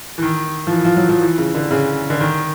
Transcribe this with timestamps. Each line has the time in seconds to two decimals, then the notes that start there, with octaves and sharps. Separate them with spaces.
0.18 E3
0.22 D#3
0.67 F3
0.72 E3
0.85 F3
0.97 F#3
1.09 F3
1.21 E3
1.38 C#3
1.54 D3
1.71 C#3
2.10 D3
2.21 D#3